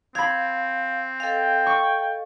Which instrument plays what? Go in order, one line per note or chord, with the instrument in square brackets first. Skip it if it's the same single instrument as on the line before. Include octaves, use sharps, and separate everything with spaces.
[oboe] C4 [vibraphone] F5 [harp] B5 G#6
[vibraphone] A4 D#5 F5 [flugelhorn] G5
[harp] C#6